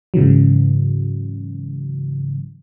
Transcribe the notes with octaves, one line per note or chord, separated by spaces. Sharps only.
G#2 C#3 E3 F#3